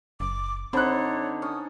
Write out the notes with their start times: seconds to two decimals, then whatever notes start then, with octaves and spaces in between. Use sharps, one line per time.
0.20 F#1 D6
0.73 D3 C4 D#4 C5 C#5 B5 F#6
1.42 C#4 D#6